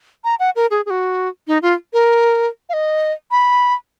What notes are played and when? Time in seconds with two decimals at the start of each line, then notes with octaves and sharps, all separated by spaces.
0.24 A#5
0.39 F#5
0.56 A#4
0.70 G#4
0.86 G#4
0.90 F#4
1.47 D#4
1.62 F4
1.93 A#4
2.69 F5
2.73 D#5
3.31 B5